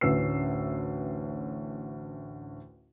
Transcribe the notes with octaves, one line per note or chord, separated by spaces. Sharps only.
A1 D2 C#4 B4 E6 C7